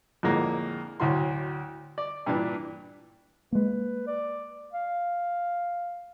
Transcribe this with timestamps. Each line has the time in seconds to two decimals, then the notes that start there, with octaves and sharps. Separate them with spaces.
0.23 F2 A2 D3 G#3 A#3
1.00 D2 A2 F#3 C6
1.98 D5
2.26 G2 A#2 E3 D4
3.52 G#3 A#3 B4
4.07 D5
4.73 F5